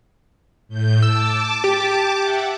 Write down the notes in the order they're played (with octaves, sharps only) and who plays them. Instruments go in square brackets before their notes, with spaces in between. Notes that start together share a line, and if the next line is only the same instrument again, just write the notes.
[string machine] A2 G6
[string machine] A5 D6 [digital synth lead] E6
[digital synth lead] G4
[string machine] E5 F#5